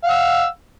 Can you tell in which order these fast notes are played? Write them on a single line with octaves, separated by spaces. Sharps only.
F5 F#5 E6